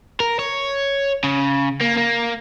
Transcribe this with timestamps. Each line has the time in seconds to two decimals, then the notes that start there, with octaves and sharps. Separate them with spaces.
0.20 A#4
0.39 C#5
1.24 C#3
1.81 A#3
1.97 A#3